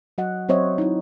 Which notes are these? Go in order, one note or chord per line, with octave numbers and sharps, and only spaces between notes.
F#3 F#4 D#5 F#5
F#3 C4 C5 C#5 D#5 E5
D#4 E4